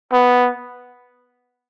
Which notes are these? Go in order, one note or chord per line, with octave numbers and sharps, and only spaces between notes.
B3